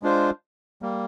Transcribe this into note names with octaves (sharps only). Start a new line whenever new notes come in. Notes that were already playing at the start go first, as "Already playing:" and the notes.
G#3 D4 F4 C5
G3 A#3